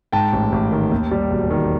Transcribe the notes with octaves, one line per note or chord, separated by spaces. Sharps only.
G#2 G5 A5
A1
A1
D#3
D#2
G3
E1
D#3